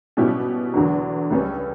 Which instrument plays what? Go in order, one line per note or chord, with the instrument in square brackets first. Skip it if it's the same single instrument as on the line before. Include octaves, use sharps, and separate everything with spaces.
[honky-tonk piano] B2 G3 C#4 E4 G4
E2 D3 F#3
C#2 C#3 G3 C#4